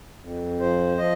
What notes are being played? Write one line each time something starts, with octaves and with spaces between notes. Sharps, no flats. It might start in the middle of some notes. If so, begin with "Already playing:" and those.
F2
F3 C5
F3 D#5